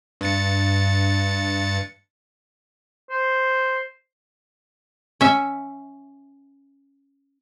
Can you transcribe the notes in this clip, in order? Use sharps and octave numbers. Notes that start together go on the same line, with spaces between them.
G2 A6 C#7
C5
C#4 E5